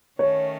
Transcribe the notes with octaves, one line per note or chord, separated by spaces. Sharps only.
D#3 A3 C#4 C#5